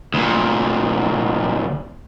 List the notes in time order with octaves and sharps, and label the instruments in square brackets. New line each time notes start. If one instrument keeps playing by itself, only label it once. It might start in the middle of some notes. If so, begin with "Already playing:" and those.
[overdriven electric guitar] D2 A#2